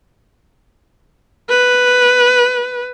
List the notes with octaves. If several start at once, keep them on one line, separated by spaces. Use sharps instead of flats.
B4